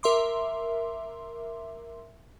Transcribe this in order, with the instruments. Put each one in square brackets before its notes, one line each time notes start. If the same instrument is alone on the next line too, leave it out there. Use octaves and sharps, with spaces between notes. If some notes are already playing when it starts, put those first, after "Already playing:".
[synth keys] A#4 E5 C6 D6